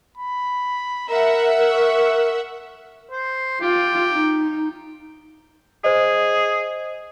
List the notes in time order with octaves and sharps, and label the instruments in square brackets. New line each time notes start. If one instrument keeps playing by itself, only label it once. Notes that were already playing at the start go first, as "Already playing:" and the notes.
[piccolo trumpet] B5
[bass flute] A#4 [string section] E5 F#5 [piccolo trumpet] A#5
[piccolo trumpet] C#6
[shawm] C5
[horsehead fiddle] F4 [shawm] G4
[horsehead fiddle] D#4
[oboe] G#4 [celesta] C5 D#5